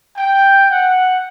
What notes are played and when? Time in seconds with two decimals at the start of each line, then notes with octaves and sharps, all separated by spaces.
0.16 G5
0.70 F#5